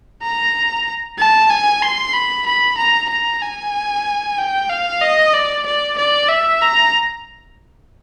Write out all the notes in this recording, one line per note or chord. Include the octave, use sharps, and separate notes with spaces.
A#5
A5
G#5
C6
B5
B5
A#5
A#5
G#5
G5
F5
D#5
D5
D5
D5
E5
A#5